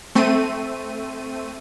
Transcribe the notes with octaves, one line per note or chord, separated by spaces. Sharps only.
A3 C4 D#7